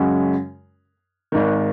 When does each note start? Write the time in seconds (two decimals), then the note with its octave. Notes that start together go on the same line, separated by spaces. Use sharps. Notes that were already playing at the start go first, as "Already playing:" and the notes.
Already playing: F#2 C#3 G#3 C#4 F#4
1.32 G#1 G#2 D#3